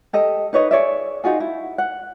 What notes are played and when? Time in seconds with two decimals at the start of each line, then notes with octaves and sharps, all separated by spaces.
0.13 G4 A4 D#5
0.53 D#4 B4 C#5 D#5
0.71 G#4 C#5 D5 E5
1.24 D#4 F4 F#4 G#4
1.40 E4
1.78 F#5